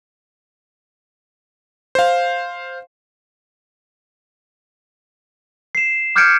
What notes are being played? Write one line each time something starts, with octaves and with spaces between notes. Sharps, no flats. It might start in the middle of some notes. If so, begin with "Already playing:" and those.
C5 F5
C7 E7
D6 F6 G6 G#6 C#7 D7